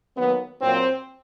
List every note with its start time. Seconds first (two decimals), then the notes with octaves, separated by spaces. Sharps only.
0.16 D#3 F#3 A#3 B3
0.62 A#2 F#3 A#3 C4